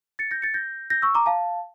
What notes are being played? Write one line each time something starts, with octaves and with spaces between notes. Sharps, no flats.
A6 C#7
G6 A#6
A6 C#7
G6 A#6
G6 A#6
C#6 E6
A#5 D6
F5 A5